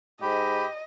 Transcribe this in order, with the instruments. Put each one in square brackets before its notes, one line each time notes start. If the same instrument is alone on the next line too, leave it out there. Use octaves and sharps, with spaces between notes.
[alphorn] G#2 [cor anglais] G4 [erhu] D#5 [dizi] B5